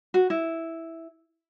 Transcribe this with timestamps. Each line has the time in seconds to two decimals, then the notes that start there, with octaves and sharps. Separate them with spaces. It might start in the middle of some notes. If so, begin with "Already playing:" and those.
0.14 F#4
0.30 E4